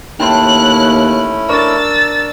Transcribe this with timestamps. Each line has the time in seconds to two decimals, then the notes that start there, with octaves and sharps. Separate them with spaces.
0.20 D#2 A3 C#4 E4 G5 A5 C6 F#6
1.49 D4 A#4 C#6 E6 A6